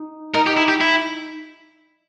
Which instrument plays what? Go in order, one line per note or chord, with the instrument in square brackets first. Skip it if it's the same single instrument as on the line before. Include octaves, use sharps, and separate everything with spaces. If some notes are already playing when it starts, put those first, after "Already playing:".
Already playing: [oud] D#4
[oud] D#4 [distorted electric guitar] A#4
[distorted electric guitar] G4
E4
G4
E4